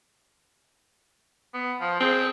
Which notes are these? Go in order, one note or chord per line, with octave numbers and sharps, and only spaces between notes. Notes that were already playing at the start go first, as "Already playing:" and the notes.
B3
F3
C4 G#4